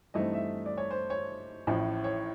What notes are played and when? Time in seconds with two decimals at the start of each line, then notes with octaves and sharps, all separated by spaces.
0.14 G2 E3 A3 C4 D#4 D#5
0.33 E5
0.66 D5
0.78 C#5
0.91 C5
1.10 C#5
1.67 A1 A2 F3
2.04 C#5